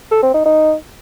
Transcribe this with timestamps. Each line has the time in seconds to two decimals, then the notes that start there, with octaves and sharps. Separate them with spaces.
0.11 A4
0.23 C4
0.34 D#4
0.46 D#4